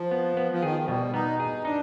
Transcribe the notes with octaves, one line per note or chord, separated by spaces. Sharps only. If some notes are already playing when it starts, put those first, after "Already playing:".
Already playing: F3
B3
B3
F3
D#3 G#4
F3
B2 G3
B3 D#4
D#4 G#4
D4 D#4